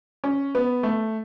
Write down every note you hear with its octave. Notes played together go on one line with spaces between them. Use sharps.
C#4
B3
A3